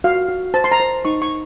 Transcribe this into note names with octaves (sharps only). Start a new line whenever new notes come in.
F#4 F5
F#4
C5 A5
C6
A#5
C5
D#4 C#6
C#6